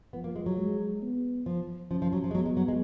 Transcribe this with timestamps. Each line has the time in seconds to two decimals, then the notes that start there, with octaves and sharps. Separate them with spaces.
0.13 F3 B3
0.24 A#3
0.36 G#3
0.46 F#3
0.58 G#3
1.02 B3
1.46 F3
1.91 F3 C#4
2.02 F3
2.13 F#3
2.24 F3
2.31 G#3
2.34 F#3 B3
2.46 G#3
2.57 F#3
2.68 G#3